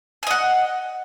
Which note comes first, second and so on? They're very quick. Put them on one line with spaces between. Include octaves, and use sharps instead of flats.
G#5 D#5 F#5